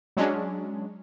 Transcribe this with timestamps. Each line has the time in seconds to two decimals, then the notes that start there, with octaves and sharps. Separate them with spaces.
0.17 F#3 G#3 C#4 D4